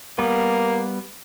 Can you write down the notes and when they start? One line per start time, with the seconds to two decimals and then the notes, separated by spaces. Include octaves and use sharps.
0.19 G3 A#3 B3